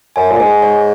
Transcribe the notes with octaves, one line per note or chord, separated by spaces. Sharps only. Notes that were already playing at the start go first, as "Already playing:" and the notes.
F#2 G#5
A#2
G#2 G#5
C#5